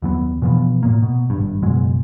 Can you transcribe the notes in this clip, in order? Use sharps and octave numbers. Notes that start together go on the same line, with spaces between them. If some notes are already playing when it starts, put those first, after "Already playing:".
D#2 F#3 B3
B2 E3 F3 B3
A2 A#3
B2
G#1 G2
F#1 B2 F#3 G#3